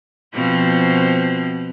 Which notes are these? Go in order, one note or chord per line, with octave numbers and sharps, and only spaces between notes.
B2 F3 C4